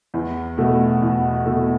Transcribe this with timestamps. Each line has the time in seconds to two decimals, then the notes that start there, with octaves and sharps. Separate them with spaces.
0.14 E2
0.58 B2 A3
1.02 E2
1.46 B2 A3